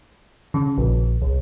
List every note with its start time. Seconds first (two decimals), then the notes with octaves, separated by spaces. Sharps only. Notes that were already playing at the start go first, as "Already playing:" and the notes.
0.54 C#3
0.78 A#1
1.22 C2